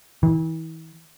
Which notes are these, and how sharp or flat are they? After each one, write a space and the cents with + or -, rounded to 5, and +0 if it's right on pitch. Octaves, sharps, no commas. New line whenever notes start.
E3 -35